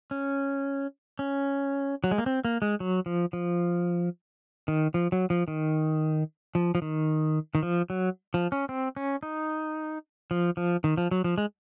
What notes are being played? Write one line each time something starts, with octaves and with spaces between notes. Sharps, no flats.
C#4
C#4
F#3
G#3
A#3
C4
A#3
G#3
F#3
F3
F3
D#3
F3
F#3
F3
D#3
F3
F3
D#3
D#3
F3
F#3
F3
C#4
C4
C#4
D#4
F3
F3
D#3
F3
F#3
F3
G#3